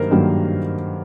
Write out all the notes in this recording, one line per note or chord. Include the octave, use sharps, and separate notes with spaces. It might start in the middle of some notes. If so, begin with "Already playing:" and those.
Already playing: G2 D#3 F#3 A#3 A#4 C5
G2 D#3 F#3 A#3